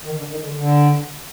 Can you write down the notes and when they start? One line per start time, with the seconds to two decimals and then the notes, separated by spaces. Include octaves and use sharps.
0.05 D#3
0.18 D3
0.31 D#3
0.44 D3
0.57 D3